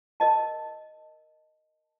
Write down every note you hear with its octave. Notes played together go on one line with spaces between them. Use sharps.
A#4 D#5 A5